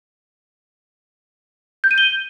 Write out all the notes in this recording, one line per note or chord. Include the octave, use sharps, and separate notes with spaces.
G6
D#7
G7